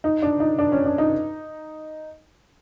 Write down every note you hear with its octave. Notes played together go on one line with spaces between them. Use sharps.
D#4
D4
D#4
D4
C#4
D4
D#4